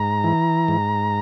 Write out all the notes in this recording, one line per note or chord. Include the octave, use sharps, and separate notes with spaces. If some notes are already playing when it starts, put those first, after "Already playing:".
Already playing: G#2 A#5
E3
G#2